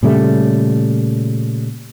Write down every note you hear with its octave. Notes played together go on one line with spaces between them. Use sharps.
A#2 C#3 G3 A3